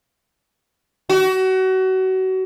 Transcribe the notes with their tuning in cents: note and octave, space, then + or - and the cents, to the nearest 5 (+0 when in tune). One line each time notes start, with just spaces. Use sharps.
F#4 +30